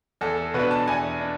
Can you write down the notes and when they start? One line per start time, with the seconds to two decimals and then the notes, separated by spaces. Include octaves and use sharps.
0.21 E2 A4
0.37 A4
0.54 B2 B3 D4 B4
0.71 A5
0.87 E2 G#5
1.21 D4